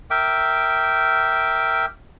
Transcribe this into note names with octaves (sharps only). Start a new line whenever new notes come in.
A#4 E5 G5 D6